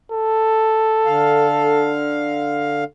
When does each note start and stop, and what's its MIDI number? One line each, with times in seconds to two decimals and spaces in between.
0.12 1.97 69
1.06 2.84 50
1.06 2.84 77